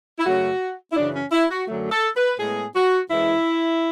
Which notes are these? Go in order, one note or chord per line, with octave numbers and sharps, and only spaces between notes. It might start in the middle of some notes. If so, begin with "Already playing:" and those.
E4
F#2 C#3 F#3 A3 F#4
E4
F#2 C#3 E3 D4
C#4
E4
F#4
F#2 D3 F#3 A3
A4
B4
A2 G#3 B3 G#4
F#4
F#2 E3 G#3 E4